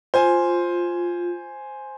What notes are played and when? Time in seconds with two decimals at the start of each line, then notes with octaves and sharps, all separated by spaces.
0.14 F4 C5 G#5